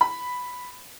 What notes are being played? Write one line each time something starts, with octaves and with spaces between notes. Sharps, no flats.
B5